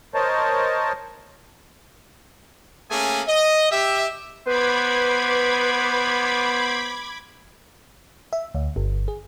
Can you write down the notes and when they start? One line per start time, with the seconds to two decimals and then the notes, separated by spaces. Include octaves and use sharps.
0.14 A#4 C5 C#5 D#5 A5
2.91 A3 A#3 C#4 G#4 G#5
3.28 D#5
3.71 G4 E5
4.47 B3 B4 C5 B5 D6 G#6
8.33 E5
8.55 D2
8.76 G1
9.08 G#4